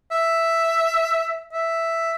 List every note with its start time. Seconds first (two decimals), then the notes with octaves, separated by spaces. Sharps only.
0.11 E5
1.52 E5